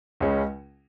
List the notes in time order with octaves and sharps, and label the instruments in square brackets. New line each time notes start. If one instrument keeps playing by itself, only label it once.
[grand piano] C#2 C#3 G#3 C#4